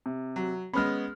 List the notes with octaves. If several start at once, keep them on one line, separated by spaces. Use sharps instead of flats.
C3
F#3
G#3 B3 C#4 B5 F6